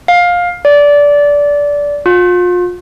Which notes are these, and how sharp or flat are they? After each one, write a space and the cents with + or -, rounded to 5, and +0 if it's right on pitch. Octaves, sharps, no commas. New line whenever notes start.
F5 +15
D5 -20
F4 +35